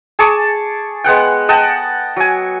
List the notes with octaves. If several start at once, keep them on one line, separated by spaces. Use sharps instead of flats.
G#4 A5 C#6 D6
G#3 B3 F#5 G5
D#5 F#5 G5 A5
F#3 G#5